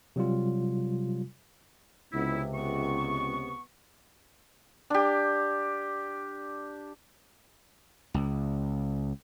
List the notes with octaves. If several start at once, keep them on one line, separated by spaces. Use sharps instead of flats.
C3 F#3 G3 F4
C#2 C3 B3 E4
B3 C#6
D4 G4
C#2